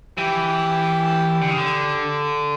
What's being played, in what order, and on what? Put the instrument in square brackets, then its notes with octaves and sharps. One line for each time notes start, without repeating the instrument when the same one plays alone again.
[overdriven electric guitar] E3 [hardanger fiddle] G4
[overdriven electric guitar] D3
C#3
D3